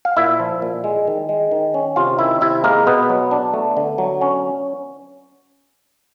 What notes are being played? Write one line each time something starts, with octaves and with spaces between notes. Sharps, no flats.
F5
A#2 E4 E5
F3
A#2
G#3
D#3
G#3
D#3
C#4
C3 F4 F5
D#3 E4 E5
C3 E4 E5
G#3 A#3 A#4
B2 B3 B4
F#3
D4
A3
D3
F#3
C#4